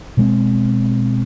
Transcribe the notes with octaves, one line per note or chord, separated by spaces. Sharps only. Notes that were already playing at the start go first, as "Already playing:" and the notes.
B2 G#3 C4